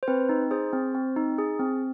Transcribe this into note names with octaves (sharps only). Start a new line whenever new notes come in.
C5
C4 B4
D#4
G#4 C5
C4
C4
D#4
G#4
C4